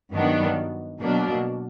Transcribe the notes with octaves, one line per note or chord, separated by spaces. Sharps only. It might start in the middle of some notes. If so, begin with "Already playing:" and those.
G2 D#3 F#3 B3 D4
B2 F#3 A#3 D4